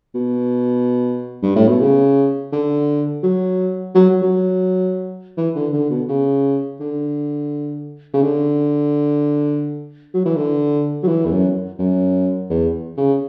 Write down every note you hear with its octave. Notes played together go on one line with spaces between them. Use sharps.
B2
G2
A2
B2
C#3
D3
F#3
F#3
F#3
E3
D3
D3
B2
C#3
D3
C#3
D3
F#3
E3
D3
F#3
E3
E2
F#2
F#2
E2
C#3